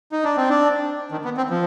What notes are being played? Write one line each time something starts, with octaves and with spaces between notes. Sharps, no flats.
D#4
D4
C4
D4
D#3
B3
C4
F3